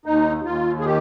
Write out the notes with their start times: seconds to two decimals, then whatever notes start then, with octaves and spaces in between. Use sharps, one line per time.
0.06 D#2 D#4
0.45 D#2 F4
0.80 G#4
0.85 D#3 G4